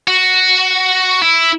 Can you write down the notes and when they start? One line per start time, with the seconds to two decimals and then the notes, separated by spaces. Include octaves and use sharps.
0.08 F#4
1.22 E4